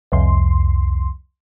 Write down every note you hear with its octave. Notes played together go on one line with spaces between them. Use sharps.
C2 F2 C6